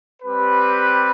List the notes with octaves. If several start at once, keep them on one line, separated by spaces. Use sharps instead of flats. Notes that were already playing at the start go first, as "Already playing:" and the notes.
G3 C4 G4 B4